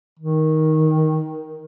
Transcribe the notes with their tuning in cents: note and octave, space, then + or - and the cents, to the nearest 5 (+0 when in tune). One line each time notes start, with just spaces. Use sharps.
D#3 +10